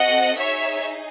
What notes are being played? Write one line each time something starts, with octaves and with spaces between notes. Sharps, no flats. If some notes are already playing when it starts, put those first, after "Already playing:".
Already playing: C4 F#4 A4 D#5 F#5
D#4 G#4 C#5 E5